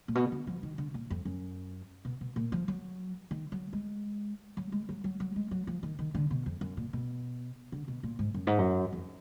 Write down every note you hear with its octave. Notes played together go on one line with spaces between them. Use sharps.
A#2
B2
D3
F3
D#3
D3
A#2
F2
F#2
B2
B2
A#2
F3
F#3
D#3
F#3
G#3
F#3
G#3
F#3
F#3
F#3
G#3
F#3
F3
D#3
D#3
D3
B2
F2
F#2
A#2
B2
D3
B2
A#2
G#2
F#2
G#2
F#2
F2